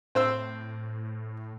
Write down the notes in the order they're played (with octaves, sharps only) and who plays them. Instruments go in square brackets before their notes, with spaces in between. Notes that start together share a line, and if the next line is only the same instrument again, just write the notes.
[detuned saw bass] A2 [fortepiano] C4 C5 E6